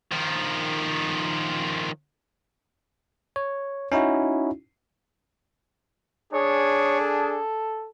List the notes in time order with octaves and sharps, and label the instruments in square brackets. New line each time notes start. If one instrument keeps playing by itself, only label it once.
[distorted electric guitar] D#3 F3
[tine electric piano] C#5
C#4 D#4 E4 F#4
[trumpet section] D4 G#4 [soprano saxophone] C#5
[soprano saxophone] A4